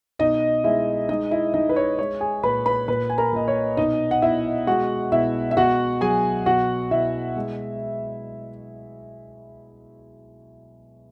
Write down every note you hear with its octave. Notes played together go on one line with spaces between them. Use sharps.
B2 D#4 D#5
G#3 E4 E5
G#3 D#4 D#5
E4 E5
G#3 D#4 D#5
B4
C#5
G#3 C#5
G#4 G#5
A#2 B4 B5
B4 B5
A#2 B4 B5
G#5
A#4 A#5
A#2 D#5
C#5
B2 D#4 D#5
F#5
B2 E4 E5
G#3 F#4 F#5
B2 E4 E5
E5
B2 F#4 F#5
F#3 G#4 G#5
B2 F#4 F#5
B2 E4 E5
G#3